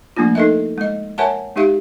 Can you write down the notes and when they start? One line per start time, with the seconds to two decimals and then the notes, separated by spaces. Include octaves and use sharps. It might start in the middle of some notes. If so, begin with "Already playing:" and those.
0.16 F3 A3 A#3 D4 F4
0.35 D#4 A4 A#4 D#5 E5
0.78 G#3 D#5
1.18 A#4 C#5 E5 F#5 G#5 A5
1.56 G#3 D#4 G4 E5 F5